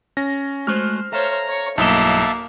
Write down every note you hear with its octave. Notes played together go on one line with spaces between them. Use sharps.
C#4 A#6
G#3 A3 F#4 C5 F6
A4 C5 C#5 E5 F5 A#5
C#5 C#6
B1 G2 A#3 E4 D#5 E5 A5 E7